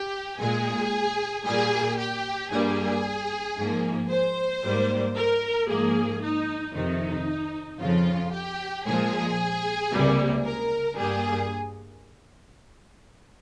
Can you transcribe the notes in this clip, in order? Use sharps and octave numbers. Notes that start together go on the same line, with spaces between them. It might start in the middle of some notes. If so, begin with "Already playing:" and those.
Already playing: G4
A#2 G#3 G#4
A#2 G3 A#3 G#4
G4
G2 G3 A#3 G#4
G#2 F3 A#3
C5
G#2 G3 A#3
A#4
G#2 F3 A#3 G#4
D#4
F2 C3 D#3 D#4
F2 C#3 F3 F4
G4
A#2 F3 G#3 G#4
C#2 C3 G3 A#3
A#4
G2 G3 A#3 G#4